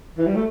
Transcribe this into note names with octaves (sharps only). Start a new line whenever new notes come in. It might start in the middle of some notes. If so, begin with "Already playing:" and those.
E3
G3
A3